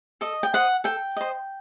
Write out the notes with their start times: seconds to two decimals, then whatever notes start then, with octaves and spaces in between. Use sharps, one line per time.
0.21 A4 D#5
0.43 G5
0.54 C5 D#5 F#5
0.84 A4 G5
1.17 C5 D#5